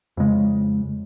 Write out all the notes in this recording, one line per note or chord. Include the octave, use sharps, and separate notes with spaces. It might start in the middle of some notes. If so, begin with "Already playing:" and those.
F2 C#3 G#3